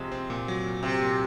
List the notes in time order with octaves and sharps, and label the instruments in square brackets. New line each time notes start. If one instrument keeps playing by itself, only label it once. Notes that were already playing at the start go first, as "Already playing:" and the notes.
Already playing: [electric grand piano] C3 [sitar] F3 G#3
[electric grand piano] C4
A#2
F#3
A#2
[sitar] C3 [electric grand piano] C4
[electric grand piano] A#2